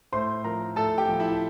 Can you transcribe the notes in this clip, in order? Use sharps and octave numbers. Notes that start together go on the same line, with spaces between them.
A2 C5 C6
F3 A#4 A#5
A2 A4 A5
G4 G5
F3
E4 E5